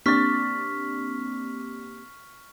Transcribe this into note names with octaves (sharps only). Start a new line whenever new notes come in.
A#3 C4 D4 G4 C#6 F6 A6 B6